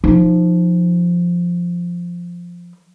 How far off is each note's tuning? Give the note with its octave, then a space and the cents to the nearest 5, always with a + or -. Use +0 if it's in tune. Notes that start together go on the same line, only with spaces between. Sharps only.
F3 +0 D#4 +0